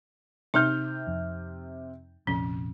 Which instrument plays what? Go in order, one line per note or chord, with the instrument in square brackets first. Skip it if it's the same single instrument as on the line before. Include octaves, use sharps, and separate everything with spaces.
[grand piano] C3 F6 G6 [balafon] D#4
[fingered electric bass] F2
[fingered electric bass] A#1 F2 C3 [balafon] C#4